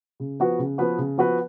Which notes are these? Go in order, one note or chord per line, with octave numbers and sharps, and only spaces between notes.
C#3
F3 B3 F#4 B4
C#3
F3 B3 F#4 B4
C#3
F3 B3 F#4 B4